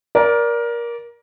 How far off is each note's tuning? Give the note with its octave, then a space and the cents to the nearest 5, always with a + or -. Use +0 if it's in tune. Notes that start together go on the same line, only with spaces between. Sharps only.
A#4 +20 D5 -15